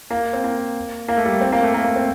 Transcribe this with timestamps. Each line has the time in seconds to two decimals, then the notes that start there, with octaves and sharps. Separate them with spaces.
0.10 A#3
0.33 C4
0.44 A#3
1.08 A#3
1.17 A3
1.25 G3
1.41 C4
1.52 A#3
1.63 A3
1.74 A#3
1.84 A#3
1.96 C4